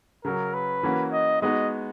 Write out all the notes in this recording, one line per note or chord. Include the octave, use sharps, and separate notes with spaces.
C#3 F#3 C#4 A#4
B4
E3 A#3 C#4 F#4
D#5
G#3 B3 D#4 F#4 D#5